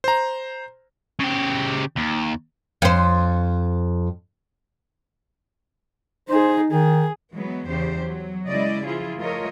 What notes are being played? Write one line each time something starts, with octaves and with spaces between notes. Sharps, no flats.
C5 A#5
C#3 G4
D#2
F2 C5
D#4 G#4 C5
D#3 G#4
E3 F#3 G#3 B3
E2 C#3 G4 C5
F#3
C#3 G#3 E4 D5 D#5
F3 E4 F4 G#4
F3 A3 F4 A#4 C#5 D#5